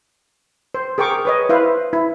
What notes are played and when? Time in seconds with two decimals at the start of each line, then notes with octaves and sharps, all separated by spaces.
0.74 C5
0.98 G#4 A#4 G5 C#6 D6
1.25 B4 C#5 D#5
1.49 E4 B4 C5 E5 F5
1.93 E4